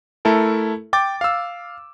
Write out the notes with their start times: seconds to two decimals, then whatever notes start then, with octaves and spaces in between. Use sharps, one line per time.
0.25 A3 E4 A4 A#4
0.93 G5 D6 A6
1.21 F5 E6